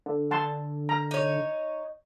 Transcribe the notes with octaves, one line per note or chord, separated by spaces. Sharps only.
D3
F#5 A5 C6
A#5
D#4 C#5